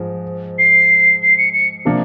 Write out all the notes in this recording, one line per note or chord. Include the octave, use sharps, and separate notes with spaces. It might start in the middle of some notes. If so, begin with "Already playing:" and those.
Already playing: G#2 F3 G#3
C7
C7
C#7
C#7
C3 F3 A#3 D4